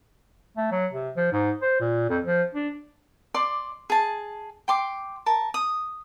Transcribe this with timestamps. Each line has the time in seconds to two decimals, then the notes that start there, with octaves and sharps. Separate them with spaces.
0.57 A3
0.71 F#3
0.92 C3
1.16 F3
1.32 G#2
1.62 C5
1.80 A#2
2.09 F2
2.24 F3
2.55 D4
3.34 D5 C6 D6
3.90 G#4 A5
4.68 G5 C6 D6
5.26 A#4 A5
5.54 D#6